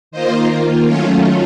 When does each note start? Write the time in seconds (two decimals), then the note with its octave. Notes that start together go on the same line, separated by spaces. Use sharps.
0.11 D#3 A#3 F4 C5 D#5
0.86 D#3 F#3 A3 C#4 F4 C#5 F5